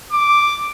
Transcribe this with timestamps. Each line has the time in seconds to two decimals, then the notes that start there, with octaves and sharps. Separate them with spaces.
0.12 D6